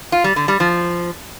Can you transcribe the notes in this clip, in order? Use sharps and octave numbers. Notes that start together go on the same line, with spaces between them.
F4
G3
D3
G3
F3